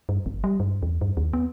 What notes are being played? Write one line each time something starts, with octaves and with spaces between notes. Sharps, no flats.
G2
G1
G3
G2
E2
G2
D#2
B3